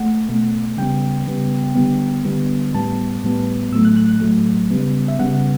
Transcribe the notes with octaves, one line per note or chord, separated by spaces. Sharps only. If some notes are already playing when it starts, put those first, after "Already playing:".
Already playing: A3 F#5
B2 A3
C#3 G3 B3 G5
C#3 G3 B3
D3 G3 B3
D3 G3 B3
A2 G3 B3 A5
A2 G3 B3
A2 F#3 A3 E6
F#6
F#6
F#6
A2 F#3 A3
C#3 G3 B3
E5
C#3 G3 B3 F#5